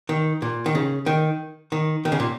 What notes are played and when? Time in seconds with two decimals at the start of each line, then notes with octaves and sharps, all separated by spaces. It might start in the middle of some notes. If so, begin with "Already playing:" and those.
0.09 D#3
0.42 A#2
0.66 D#3
0.75 C#3
1.06 D#3
1.72 D#3
2.05 D#3
2.12 C#3
2.20 A#2